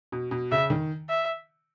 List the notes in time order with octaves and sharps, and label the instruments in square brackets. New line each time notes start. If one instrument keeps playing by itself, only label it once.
[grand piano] B2
B2
[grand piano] C#3 [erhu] E5
[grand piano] D#3
[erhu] E5